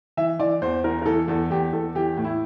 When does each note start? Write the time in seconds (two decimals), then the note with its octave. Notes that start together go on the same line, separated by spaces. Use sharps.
0.17 E3 E5
0.39 E3 D5
0.62 E2 C5
0.84 E3 A#4
1.02 A#4
1.06 E3 A4
1.28 E2 A4
1.50 E2 G4
1.73 E2 A4
1.95 E3 G4
2.17 A2
2.24 E4